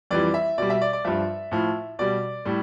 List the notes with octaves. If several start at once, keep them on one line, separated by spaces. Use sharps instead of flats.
F2 E3 G3 D5
E5
B2 G3 D5
E5
D5
D5
G2 F3 E5
A2 F3
B2 G3 D5
A2 G3